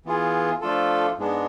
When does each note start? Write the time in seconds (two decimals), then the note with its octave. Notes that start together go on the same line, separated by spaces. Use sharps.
0.05 E3 B3 F4 G#4
0.61 F3 A3 D4 F4 A4
1.18 G#2 G#3 B3 D4